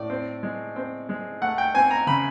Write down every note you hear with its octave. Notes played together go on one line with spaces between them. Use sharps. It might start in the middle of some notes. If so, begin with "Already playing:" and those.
Already playing: A2 D5
C4
G#3
C4
G#3
A3 F#5
G5
C4 G#5
A#5
C#3 B5